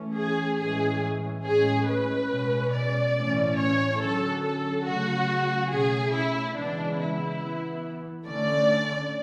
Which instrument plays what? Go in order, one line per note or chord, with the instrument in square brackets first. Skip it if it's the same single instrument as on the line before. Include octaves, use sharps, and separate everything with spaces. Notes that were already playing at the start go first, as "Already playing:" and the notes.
Already playing: [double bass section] E3 A3 C#4
[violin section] G#4
[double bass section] A2 E3 G#3 C#4 [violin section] G#4
[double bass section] A2 G#3 C#4 [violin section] G#4
[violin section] B4
[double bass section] B2 G#3 C#4
[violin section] D5
[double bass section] A2 E3 A3 C#4
[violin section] C#5
[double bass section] D3 F#3 C#4 [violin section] A4
[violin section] A4
[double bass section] C#3 F#3 A3 [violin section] F#4
[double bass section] B2 A3 C#4 [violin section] G#4
[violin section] E4
[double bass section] C#3 E3 G#3 B3 [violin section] D4
[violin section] E4
[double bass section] E3 B3
[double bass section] D3 A3 C#4 [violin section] D5